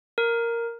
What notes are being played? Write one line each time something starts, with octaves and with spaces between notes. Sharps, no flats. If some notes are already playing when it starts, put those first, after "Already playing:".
A#4